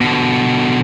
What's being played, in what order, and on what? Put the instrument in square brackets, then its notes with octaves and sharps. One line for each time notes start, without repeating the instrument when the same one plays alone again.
[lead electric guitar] B2 D3